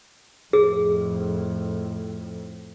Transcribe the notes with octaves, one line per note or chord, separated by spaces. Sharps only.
F2 A2 G#4